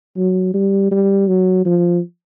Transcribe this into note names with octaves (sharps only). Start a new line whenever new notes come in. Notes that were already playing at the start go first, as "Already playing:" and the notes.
F#3
G3
G3
F#3
F3